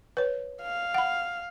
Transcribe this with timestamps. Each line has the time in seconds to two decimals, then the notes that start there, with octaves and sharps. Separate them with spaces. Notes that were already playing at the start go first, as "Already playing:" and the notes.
0.17 B4 C#5
0.62 F5
0.94 F#5 B5